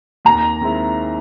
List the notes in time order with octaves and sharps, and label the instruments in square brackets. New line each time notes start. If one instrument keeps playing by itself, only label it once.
[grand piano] D#2 [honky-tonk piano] A#5
[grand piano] D#3 G#3 C4 E4